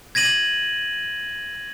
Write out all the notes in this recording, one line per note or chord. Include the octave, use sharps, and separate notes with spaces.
G#6 A#6 D#7 F#7